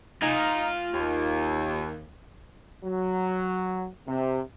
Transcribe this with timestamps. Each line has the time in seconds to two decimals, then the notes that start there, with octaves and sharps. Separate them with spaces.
0.22 D#4 F4 G#5
0.94 D#2
2.84 F#3
4.07 C3